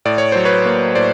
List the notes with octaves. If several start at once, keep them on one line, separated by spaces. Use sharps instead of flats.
A2 D5
C#5
F#3 C5
B4 C#5
A#3
A2 C5 D5